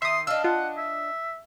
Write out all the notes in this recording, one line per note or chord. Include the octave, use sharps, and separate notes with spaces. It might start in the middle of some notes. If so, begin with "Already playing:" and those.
D#3 E5 C6 D#6
D4 D#5 F5 E6
F4 F#5
E5